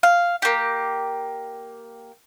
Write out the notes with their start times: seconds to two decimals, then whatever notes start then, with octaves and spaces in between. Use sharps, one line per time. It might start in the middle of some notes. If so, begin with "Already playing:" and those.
0.03 F5
0.42 A#3 G4